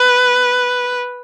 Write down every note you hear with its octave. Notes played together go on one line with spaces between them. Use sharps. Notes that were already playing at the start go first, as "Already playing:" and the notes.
Already playing: B4